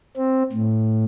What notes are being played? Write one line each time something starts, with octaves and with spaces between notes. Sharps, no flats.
C4
A2